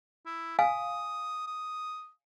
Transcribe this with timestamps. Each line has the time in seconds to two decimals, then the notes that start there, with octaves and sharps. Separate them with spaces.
0.26 E4
0.59 F5 G#5 D#6
1.47 D#6